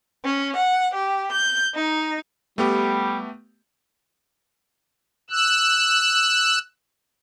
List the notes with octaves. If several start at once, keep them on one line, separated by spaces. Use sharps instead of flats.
C#4
F#5
G4
G6
D#4
G3 A3 B3 G4
E6 F#6